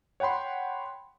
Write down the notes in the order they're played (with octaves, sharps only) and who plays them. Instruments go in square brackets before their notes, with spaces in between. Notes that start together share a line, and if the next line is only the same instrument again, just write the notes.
[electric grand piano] C#5 F#5 G5 B5 C6